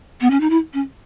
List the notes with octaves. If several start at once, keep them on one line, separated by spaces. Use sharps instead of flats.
B3
C#4
D#4
E4
C#4